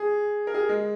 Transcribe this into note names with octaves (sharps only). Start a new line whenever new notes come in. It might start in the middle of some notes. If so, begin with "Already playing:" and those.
Already playing: G#4
A#4
G#4
G#3